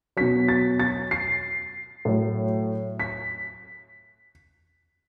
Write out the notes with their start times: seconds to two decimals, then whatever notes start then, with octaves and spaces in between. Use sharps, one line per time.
0.17 B2 F#3 B6
0.48 A6
0.80 A6
1.11 C7
2.05 A2 F#3
3.00 B6